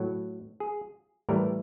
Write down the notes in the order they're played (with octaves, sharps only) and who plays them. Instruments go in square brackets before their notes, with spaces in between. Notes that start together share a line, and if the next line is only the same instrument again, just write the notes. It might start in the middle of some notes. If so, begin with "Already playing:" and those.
Already playing: [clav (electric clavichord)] A2 F#3
G#4
A2 E3 G3 A#4